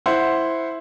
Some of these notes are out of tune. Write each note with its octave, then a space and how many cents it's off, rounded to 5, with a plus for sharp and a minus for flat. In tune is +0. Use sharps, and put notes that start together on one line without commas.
E4 +0 C5 +0 F#5 +0